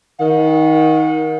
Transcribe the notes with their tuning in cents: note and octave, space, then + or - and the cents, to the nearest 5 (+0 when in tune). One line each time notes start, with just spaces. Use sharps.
D#3 +20 F#5 -35